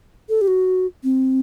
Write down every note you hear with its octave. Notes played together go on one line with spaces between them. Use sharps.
A4
G4
F#4
C4